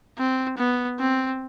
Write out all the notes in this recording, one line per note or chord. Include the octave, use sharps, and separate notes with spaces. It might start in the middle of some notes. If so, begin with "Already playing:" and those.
C4
B3
C4